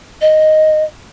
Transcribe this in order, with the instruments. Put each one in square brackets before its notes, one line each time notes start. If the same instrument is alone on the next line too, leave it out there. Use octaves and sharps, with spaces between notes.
[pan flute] D#5